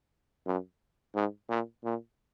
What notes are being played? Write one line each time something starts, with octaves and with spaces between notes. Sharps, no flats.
F#2
G#2
A#2
A#2